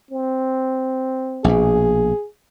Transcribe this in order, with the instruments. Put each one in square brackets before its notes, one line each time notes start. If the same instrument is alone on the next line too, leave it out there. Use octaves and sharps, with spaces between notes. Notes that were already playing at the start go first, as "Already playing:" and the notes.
[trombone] C4
[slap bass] A#1 B2 [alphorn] G#4